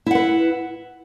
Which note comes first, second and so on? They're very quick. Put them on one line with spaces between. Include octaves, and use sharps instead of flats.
E4 F#5 B4